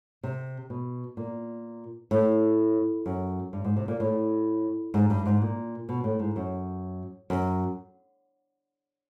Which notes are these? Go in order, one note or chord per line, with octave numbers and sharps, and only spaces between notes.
C3
B2
A#2
A2
F#2
G2
G#2
C3
A#2
A2
G#2
G2
G#2
A#2
B2
A2
G#2
F#2
F#2